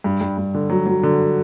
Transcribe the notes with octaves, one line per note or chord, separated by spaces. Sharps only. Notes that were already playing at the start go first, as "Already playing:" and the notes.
G2
G2
G2
D3
F#3
F#3
D3